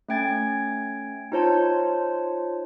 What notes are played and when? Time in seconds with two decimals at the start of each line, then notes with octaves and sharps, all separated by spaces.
0.09 A3 C#4 G5 G#6 A6
1.32 D#4 F4 C5 C#5 A5